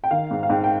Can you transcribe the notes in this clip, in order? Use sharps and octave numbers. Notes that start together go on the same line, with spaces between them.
G5
D#3 F5
G#2
F5
G#2 G5
G5